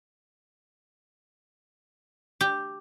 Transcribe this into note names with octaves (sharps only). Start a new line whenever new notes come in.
G4